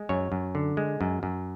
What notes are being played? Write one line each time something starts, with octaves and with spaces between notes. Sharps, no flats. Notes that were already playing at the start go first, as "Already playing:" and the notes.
Already playing: G#3
F#2 C#5
F#2
D3
G#3
F#2
F#2